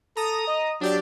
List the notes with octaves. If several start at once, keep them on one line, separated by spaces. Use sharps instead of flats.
A4 A#5 D#6
D#5
F#3 D4 G4 D5